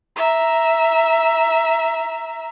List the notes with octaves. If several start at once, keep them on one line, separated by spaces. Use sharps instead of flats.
E5 A#5